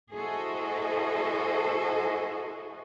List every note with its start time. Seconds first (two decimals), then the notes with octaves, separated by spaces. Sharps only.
0.14 E4 F#4 G#4 A4 C5 D#5